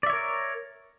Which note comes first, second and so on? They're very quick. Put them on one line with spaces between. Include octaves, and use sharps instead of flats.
D5 E5 C#5 A#4